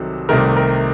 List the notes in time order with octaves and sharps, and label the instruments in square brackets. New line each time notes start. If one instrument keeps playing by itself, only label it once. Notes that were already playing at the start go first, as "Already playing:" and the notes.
Already playing: [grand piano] C2 C3 D#3 F#3 A4
C2 C3 D#3 A3 A#4
A#4